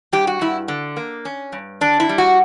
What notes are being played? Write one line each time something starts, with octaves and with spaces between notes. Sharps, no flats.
G2 G4
F#4
G2 E4
D3
A#3
C#4
G2
D3 D4
E4
G3
F#4